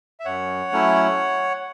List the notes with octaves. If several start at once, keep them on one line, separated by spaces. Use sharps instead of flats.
E5
F#2 C#5 F#5
F#3 A3 C#4 E4